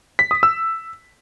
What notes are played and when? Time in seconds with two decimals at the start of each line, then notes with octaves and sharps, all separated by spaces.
0.19 B6
0.31 D#6
0.43 E6